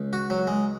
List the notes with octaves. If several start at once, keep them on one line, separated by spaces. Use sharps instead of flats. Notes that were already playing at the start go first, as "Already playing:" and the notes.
Already playing: C#2
F#4
F#3
G#3